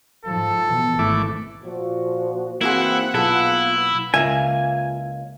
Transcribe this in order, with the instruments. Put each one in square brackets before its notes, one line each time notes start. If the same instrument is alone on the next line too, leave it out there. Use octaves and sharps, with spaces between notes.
[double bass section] G#2 F3 [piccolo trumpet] A4
[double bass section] B2 E3
[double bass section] G#1 [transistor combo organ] E3 A3 D6
[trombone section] A#2 F3 F#4
[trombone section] E3 C4 [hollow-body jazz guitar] A#3 F#4 G#4 [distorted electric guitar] E4 [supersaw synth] F#5
[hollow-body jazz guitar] B1 G#4 A4 [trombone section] A#3 B3 F4 [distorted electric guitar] E4
[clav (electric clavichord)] C#2 A#3 [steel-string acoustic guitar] F4 F5 [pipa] E5 [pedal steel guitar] G#5